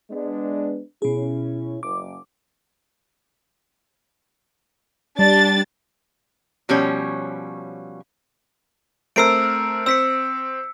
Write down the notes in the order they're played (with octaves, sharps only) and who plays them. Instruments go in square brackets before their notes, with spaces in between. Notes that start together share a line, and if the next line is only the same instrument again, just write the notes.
[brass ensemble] G#3 B3 D4
[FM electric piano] B2 G#4 [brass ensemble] C#4 E4
[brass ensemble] F#1 [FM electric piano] D6
[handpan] G3 [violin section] D4 A6
[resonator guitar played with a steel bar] B2 F3 G3 C#4 C#5
[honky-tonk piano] A3 C4 A#4 [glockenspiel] E6 C7 D7
[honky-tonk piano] C4 [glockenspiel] E6 B6 C#7